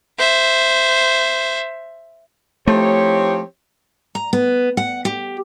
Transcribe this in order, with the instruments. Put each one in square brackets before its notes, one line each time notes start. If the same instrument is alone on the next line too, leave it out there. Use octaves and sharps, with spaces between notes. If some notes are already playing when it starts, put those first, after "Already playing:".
[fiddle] C5 E5
[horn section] F3 E4 G4 [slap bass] A3 [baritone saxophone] C4 [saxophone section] D#4 C#5
[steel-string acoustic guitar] A#5
B3
F#5
G4